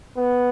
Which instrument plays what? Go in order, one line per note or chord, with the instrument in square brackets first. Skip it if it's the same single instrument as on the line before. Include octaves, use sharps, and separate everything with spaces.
[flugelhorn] B3